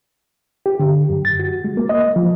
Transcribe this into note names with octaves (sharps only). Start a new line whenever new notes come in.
G4
D3
F#2
A6
F#4
G#3
A#3
D#5
F3